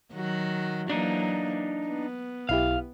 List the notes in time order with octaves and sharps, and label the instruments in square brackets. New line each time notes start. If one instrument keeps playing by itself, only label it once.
[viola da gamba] D#3 F#3 F#4
[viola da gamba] E3 F#3 A#3 [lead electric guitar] D4 D#4
[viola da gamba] B3
[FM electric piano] B1 E4 G4 [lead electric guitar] F5